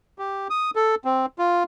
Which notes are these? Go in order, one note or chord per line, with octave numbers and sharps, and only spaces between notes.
G4
D#6
A4
C4
F4